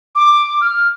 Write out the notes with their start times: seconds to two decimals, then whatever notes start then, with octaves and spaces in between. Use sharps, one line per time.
0.15 D6
0.61 F6